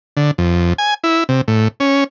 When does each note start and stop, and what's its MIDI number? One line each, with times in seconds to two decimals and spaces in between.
0.17 0.31 50
0.38 0.73 41
0.78 0.94 80
1.04 1.24 64
1.29 1.41 48
1.48 1.68 45
1.80 2.04 61